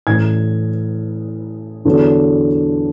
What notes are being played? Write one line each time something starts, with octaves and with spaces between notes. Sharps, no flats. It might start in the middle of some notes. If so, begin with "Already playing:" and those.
A1 A2 E3 G#6
E2 D3 F#3